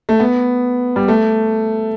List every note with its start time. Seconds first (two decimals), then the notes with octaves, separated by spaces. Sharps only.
0.09 A3
0.20 B3
0.96 G3
1.08 A3